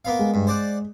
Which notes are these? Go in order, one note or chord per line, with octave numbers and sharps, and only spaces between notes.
A#3 B3 F5
G#3
G2
C5 D5 F#5